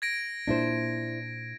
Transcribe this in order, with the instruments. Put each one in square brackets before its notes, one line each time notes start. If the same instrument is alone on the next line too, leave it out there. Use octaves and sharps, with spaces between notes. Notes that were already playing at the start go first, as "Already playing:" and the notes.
[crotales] G#6 A#6 D7
[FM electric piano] A#2 [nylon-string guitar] D4 E4 C5